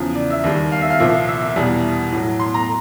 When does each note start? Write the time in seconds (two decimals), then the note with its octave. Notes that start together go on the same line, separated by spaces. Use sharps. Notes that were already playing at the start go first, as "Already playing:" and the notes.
Already playing: E2 C#3 F3
0.15 D5
0.30 E5
0.44 D#2 D#3 G3
0.72 F5
0.81 E5
0.90 F5
1.00 C2 A#2 F3 E5
1.28 E5
1.41 E5
1.56 E2 B2 G3
2.13 A2 F#3
2.40 C6
2.54 A#5